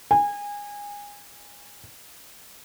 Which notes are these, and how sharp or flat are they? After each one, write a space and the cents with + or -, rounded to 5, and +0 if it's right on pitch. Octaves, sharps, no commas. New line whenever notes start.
G#5 -25